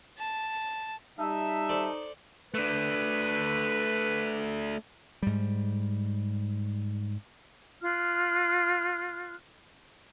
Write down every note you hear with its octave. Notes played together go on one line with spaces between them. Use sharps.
A5
G3 D#4 E5 A5
A4 C5 D5
A3 D4 B4
G#2 G3
F4 F6 F#6